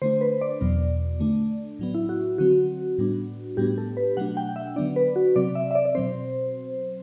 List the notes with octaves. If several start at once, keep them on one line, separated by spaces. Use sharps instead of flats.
D3 A3 D4 C5
B4
D5
E2 B2 F#3 B3
D3 A3 D4
A2 F#3 B3
E4
F#4
D3 F#3 C4 F#4
A2 G3 B3 D4
A2 G3 B3 D4 G4
A4
B4
B2 F#3 A3 D4 F#5
G5
E5
D3 F#3 B3 D4 D5
B4
F#4
C3 F#3 C4 D5
E5
E5
D5
D5
B2 F#3 C4 C5